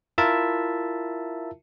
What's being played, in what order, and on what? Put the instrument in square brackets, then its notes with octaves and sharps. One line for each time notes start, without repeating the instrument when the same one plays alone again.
[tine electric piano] E4 F4 A#4 E5 A5